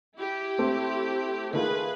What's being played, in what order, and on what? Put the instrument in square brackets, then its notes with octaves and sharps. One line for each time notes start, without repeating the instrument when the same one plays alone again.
[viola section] E4 G4
[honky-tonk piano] A3 C4
[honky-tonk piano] D#3 A3 F4 [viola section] G#4 B4